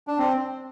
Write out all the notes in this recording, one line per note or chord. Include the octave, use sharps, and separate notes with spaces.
D4
C4